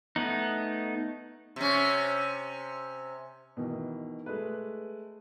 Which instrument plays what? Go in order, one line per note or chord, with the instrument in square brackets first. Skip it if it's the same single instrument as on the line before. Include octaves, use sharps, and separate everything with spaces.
[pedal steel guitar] A3 B3 D#4
[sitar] C3 C#4
[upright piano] B2 D#3 E3
G#3 A3 B4